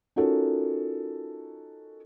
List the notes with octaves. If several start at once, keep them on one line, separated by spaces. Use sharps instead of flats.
C#4 D#4 F4 F#4 A4 A#4